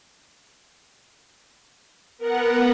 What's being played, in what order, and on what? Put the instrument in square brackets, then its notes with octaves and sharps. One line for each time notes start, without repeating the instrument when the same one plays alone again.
[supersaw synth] B3 [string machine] A#4 F#5